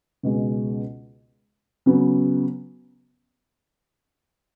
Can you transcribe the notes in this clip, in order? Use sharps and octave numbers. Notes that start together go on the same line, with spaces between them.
C#2 B2 G#3
C#3 F#3 B3